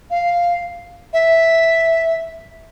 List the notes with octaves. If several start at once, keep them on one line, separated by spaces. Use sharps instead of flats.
F5
E5